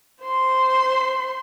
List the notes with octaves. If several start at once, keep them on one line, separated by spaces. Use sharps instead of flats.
C5 C6